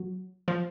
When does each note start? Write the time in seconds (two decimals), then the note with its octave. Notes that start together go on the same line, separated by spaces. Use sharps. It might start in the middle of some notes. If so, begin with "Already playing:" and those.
Already playing: F#3
0.48 F3